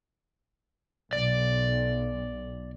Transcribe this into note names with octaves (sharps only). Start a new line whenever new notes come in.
B1 D5